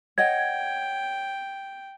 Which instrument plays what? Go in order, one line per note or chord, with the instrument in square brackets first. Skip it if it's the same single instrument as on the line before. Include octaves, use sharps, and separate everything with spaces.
[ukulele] C#5 D#5 F#5 [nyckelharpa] G5 [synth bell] G#6